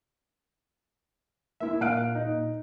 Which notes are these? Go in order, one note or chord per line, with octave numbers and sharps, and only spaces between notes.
A#3 E4 E5
A#2 F5 F#6 D7
D#4